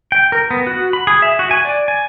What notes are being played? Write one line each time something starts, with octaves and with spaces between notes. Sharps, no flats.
G5
A#4
B3
F#4
B5
G#4
E5
F#4
G#5
D5
G#5